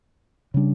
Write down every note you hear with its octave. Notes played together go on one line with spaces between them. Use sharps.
C#3 G3 D4